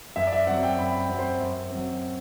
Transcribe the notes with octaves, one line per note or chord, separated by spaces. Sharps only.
F#2 E5
D5
E5
F#3 C4 F#5
G5
F#2 B5
G5
F#3 C4
C5
F#2
F#3 C4